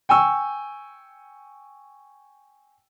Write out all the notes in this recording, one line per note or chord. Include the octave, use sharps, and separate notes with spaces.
G5 G#5 C#6 E6